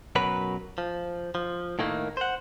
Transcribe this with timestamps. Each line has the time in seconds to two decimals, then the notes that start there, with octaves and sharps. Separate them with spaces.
0.16 F#2 B2 F#3 A#4 B4 B5
0.78 F3
1.35 F3
1.79 A2 D#3 A3 A#3
2.17 C5 F#5